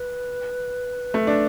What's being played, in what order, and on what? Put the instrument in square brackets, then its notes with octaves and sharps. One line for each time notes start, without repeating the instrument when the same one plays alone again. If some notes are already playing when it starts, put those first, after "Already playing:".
Already playing: [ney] B4
[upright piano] A3
D4